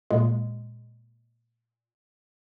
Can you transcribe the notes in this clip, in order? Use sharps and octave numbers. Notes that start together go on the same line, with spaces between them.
A#2 G#3